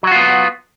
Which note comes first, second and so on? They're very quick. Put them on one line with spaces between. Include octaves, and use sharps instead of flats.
F#3 F#4 F4 B3